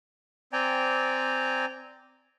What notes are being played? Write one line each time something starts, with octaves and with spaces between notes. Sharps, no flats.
C4 D5 G5 G#5 A#5